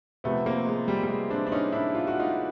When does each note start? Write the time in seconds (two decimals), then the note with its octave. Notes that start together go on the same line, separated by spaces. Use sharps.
0.24 C3 F3 A3 B3
0.46 A#3 C4
0.66 G#3
0.88 G3
1.03 G3
1.09 G#3
1.30 C4 D4
1.47 D4
1.52 C#4 D#4
1.72 D4 E4
1.95 F4
2.07 F#4
2.20 D#4 F4